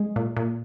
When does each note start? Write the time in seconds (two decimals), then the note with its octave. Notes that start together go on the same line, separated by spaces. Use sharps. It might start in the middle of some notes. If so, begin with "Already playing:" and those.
Already playing: G#3
0.16 A#2
0.37 A#2